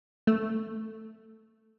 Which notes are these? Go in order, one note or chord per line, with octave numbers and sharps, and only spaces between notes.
A3